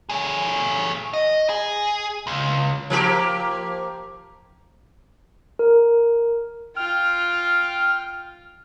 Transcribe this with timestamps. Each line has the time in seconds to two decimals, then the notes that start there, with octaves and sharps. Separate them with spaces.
0.10 A3 G#4
1.13 D#5
1.49 G#4
2.27 C#2
2.90 F3 A#3 G4
5.59 A#4
6.76 F4 G5 F6